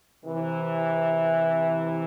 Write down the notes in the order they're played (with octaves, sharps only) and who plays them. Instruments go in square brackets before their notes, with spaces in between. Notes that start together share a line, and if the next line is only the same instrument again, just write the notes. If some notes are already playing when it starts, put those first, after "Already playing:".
[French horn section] C3 E3